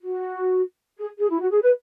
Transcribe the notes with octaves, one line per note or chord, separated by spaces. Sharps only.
F#4
G#4
G#4
E4
F#4
G#4
B4